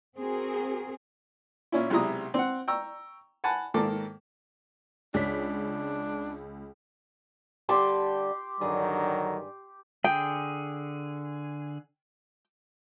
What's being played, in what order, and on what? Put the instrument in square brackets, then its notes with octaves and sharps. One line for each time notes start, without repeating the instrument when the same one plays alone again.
[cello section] C4 F#4 G#4 A#4
[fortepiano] A#2 C#4 E4
B1 C3 G#3 E4 A#5 D#6
C4 F#5
G5 A#5 C#6 E6
F#5 G#5 A5 B5
G#2 D#3 A#3 A4 A5 D6
[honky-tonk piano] C#2 C#5 B6 [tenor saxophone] D4
[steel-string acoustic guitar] D3 G3 A5 [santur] G4 C6
[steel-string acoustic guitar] G2 G#4 D5 [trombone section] D3 D#3 F#3
[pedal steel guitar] D3 G#4 [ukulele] G5